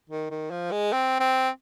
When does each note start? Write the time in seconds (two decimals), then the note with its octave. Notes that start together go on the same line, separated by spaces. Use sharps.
0.10 D#3
0.31 D#3
0.51 F3
0.72 G#3
0.93 C4
1.20 C4